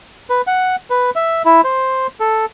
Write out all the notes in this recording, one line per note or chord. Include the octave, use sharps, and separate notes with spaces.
B4
F#5
B4
E5
E4
C5
A4